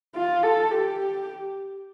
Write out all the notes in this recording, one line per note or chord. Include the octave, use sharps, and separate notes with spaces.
F4
A4
G4
G4